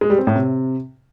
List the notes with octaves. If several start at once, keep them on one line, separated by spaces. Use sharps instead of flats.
G#3
G3
C4
A2
C3